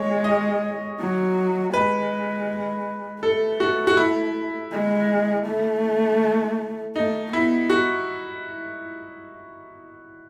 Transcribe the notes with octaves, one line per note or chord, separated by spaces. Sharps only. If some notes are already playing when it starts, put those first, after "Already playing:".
Already playing: G#3 C#5
D#5
F#3
G#3 B4
A3 A4
F#4
F#4
E4
G#3
A3
A3 D#4
B3 E4
F#4